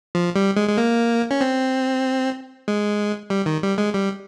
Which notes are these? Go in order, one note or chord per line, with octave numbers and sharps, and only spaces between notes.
F3
G3
G#3
G#3
A#3
C#4
C4
G#3
G3
D#3
G3
G#3
G3